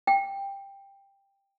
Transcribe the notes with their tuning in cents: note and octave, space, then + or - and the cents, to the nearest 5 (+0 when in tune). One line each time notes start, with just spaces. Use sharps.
G5 +10